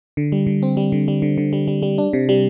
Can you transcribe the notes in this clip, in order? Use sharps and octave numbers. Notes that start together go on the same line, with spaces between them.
D3
G3
D3
C4
G3
D3
G3
D3
D3
G3
G3
G3
D4
C3
G3